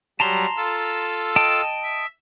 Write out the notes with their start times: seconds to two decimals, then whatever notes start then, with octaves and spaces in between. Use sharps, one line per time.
0.20 F#3 G3 A5 A#5 C6
0.57 F4 A4 E6
1.36 D#5 G5 A5
1.83 E5